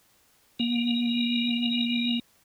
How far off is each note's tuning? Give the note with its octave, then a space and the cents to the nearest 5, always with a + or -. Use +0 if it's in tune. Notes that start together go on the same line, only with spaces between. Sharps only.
A#3 +35